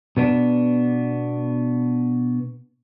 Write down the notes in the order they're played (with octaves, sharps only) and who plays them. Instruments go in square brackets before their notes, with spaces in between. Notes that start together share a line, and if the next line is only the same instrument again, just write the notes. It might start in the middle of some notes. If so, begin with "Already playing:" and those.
[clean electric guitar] B2 B3 D4